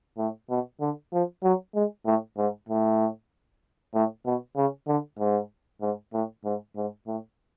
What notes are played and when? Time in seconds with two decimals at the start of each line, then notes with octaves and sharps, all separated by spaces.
0.18 A2
0.50 B2
0.81 D3
1.13 F3
1.44 F#3
1.75 G#3
2.06 A2
2.37 G#2
2.69 A2
3.94 A2
4.26 B2
4.56 C#3
4.88 D3
5.19 G#2
5.81 G#2
6.13 A2
6.45 G#2
6.76 G#2
7.07 A2